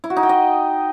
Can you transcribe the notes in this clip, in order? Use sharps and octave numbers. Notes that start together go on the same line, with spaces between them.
E4
F#4
D#4
G5
D#5